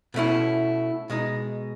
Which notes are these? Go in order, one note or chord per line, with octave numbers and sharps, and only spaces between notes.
B2 A3 C#4 E4
B2 G#3 D#4